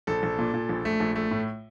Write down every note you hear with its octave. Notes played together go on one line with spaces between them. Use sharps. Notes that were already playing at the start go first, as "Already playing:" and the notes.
A#1 A4
A#1
A#2
A#2
A#1
A3
A#1
A3
A2